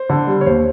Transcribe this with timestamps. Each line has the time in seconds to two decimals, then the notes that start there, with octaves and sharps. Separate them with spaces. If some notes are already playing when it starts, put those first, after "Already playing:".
Already playing: C5
0.10 D3
0.27 G3
0.41 C#5
0.46 D#2 C5